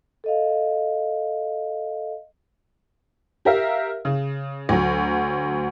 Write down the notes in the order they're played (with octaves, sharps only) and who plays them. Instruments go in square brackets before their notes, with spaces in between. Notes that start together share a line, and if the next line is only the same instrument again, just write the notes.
[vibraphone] A4 D#5 F5
[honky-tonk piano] G4 A#4 E5 F5
C#3
D2 F#3